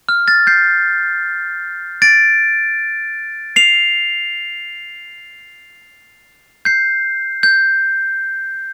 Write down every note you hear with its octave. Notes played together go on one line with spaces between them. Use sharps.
F6
F6 A6
G6 C7
A6 D7
C7 F7
G6 C7
G6